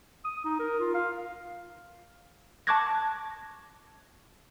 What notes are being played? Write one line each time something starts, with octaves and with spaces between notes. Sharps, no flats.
D#6
D#4
A#4
F4
F5
A5 C#6 D6 F#6 G#6 A#6